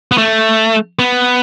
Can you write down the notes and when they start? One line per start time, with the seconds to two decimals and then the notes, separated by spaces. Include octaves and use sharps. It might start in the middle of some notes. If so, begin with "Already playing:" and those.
0.12 B3
0.18 A3
0.99 B3